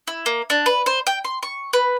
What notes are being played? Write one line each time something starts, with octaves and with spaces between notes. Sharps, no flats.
E4
A#3
D4
B4
C5
G5
C6
C#6
B4